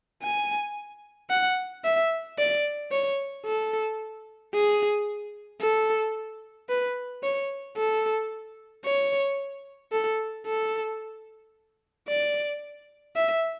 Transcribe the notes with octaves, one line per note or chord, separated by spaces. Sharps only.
G#5
F#5
E5
D5
C#5
A4
G#4
A4
B4
C#5
A4
C#5
A4
A4
D5
E5